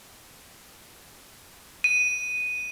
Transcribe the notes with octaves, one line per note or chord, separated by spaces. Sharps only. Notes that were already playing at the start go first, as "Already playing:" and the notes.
D#7